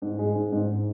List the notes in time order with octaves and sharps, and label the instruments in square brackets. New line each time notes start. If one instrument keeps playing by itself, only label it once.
[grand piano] G#2
G#3
G#2
G#2